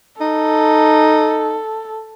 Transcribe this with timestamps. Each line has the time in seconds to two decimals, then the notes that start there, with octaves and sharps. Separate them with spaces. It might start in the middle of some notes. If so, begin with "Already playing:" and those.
0.21 D#4 A4